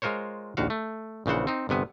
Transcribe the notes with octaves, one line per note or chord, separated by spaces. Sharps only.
G#3 F4 A#4 C5 C#5
A#1 D#2 F#4 F5
A3
A#1 C#3 E3 C5 F#5
C4 D#4
G1 C3 B3 G#5